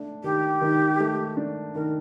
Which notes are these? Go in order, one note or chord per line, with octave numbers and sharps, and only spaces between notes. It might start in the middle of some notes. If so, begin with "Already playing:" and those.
Already playing: A3 D4
D#3 G4
D#3
A3
D4
D#3 A#4